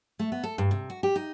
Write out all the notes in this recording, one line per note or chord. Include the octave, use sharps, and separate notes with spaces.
A3
B3
A4
G2
C3
F#4
G4
D#4